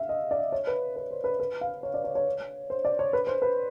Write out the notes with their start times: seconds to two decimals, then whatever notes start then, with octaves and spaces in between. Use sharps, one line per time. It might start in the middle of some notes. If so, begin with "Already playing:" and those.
Already playing: E5 F5
0.09 D#5
0.31 D5
0.52 C#5
0.67 B4
0.96 B4
1.11 C5
1.24 B4
1.40 B4
1.61 F5
1.83 C#5
1.94 D5
2.04 C#5
2.15 C#5
2.70 C5
2.85 D5
2.99 C#5
3.13 B4
3.27 C5
3.42 B4